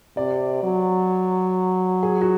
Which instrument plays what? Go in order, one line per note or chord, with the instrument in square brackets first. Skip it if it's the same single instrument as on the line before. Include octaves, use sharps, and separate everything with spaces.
[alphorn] C3 [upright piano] D5
[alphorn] F#3
[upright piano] G#4
F#4